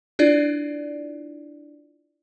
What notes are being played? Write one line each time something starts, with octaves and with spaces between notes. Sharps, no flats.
D4 E4 F4 D5